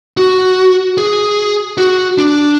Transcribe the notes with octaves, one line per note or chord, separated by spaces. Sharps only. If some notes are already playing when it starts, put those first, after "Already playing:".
F#4
G#4
F#4
D4